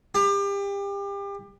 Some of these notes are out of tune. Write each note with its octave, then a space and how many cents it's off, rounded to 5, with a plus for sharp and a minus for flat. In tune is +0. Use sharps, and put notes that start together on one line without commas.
G4 +30